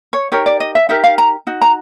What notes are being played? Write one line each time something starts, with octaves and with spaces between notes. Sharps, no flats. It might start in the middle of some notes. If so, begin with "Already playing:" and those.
C#5
D#4 G4 A#4 C#5
D5
D#5
E5
D#4 G4 A#4 E5
F5
A#5
D#4 F#4
A#5